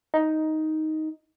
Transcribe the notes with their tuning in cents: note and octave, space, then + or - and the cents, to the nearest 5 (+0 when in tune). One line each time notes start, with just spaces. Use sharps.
D#4 +5